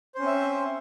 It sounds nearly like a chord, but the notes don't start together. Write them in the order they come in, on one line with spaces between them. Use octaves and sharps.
C5 C#4 C4 E5